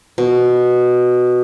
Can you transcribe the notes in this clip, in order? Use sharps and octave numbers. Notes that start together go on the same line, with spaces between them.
B2